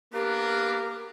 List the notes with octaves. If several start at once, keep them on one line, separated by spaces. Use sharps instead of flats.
A#3 B3 D4 G4 A#4